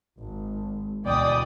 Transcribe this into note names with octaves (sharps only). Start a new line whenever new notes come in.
G#1
D2 B2 E3 D5 G5 D#6